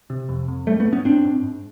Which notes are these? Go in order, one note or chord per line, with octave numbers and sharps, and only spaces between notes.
C3
F2
F2
G#2 G3 A3
A3 B3
G#2
B3 C#4
G#2 C4 D4
G#2
G#2